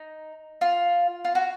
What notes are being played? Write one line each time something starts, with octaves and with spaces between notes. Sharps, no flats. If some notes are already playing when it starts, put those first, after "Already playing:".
Already playing: D#4
F4
F4
F#4